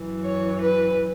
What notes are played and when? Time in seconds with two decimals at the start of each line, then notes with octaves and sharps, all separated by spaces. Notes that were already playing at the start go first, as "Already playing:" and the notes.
Already playing: F#2 E3
0.26 C#5
0.62 B4